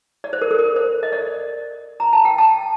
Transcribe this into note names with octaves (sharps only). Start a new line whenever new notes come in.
D5
C5
A#4
A4
A#4
C5
D#5
D5
A#5
A5
G5
A5